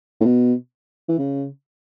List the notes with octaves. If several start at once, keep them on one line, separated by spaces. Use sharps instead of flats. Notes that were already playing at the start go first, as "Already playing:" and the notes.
A2
B2
E3
C#3